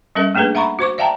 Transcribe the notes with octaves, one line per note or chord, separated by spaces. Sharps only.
G3 C#4 A4 A#4 E5
A3 A#3 D4 G#4 A4 B4
E5 F#5 A#5 B5 C#6
F#4 C5 C#6 D6
D5 E5 F5 G5 A5 A#5